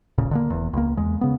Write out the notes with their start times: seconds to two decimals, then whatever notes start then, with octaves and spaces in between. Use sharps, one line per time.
0.18 D#1 A1 A#2 C#3
0.31 D3 D#3 A#3
0.50 E1 E2
0.73 C#2 A#3
0.97 E2 G#3
1.21 C#3 B3